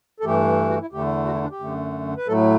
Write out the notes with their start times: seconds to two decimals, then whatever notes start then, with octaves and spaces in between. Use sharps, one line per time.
0.20 A4
0.24 G2 E3 A3 G4
0.70 F#4
0.81 E4
0.92 E2 D3 A3 G4
1.26 F#4
1.34 E4
1.43 D4
1.51 G4
1.60 F#2 D3 A3
2.17 B4
2.27 A2 F#3 A3 A4